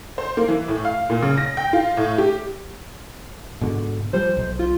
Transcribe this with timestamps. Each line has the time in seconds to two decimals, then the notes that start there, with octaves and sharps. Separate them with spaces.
0.18 C5
0.37 A#3
0.48 E3
0.68 A2
0.85 F5
1.10 A#2
1.22 C#3
1.37 A#6
1.57 G5
1.73 F4
1.97 A2
2.18 G4
3.61 G#2 B2 D3
4.13 F3 G3 C5
4.37 B1
4.59 F4